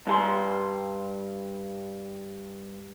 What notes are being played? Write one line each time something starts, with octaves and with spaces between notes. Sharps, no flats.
G2 A4 C6